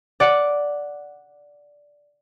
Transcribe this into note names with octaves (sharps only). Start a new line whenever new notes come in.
D5 F#5